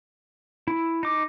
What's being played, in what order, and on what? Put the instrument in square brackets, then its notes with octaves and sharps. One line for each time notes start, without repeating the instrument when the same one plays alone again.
[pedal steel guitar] E4
D#4 D6